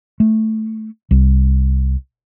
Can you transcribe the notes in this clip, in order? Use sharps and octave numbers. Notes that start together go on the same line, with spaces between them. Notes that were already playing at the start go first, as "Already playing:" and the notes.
A3
C2